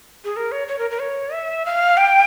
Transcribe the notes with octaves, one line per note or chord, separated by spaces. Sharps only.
G#4
A#4
C#5
C#5
A#4
A#4
C#5
E5
F5
G5